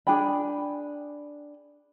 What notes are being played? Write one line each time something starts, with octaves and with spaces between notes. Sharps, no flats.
D4 G#4 G5 B5